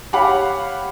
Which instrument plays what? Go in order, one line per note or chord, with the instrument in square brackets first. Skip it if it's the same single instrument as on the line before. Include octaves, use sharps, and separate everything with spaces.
[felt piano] G4 C#5 F5 F#5 B5 D6